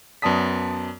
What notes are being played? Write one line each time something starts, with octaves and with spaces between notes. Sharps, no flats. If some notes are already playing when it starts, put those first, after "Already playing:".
F#2 B3 D5 A5 D#6 B6